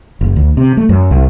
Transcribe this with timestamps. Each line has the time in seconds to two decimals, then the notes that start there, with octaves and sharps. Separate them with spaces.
0.21 F#1
0.36 D2
0.57 C3
0.77 A3
0.89 F#2
1.11 C2